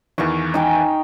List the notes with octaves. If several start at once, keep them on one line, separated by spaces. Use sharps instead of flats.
E2 D#3 E3 F5 C#6
D#4 G5 G#5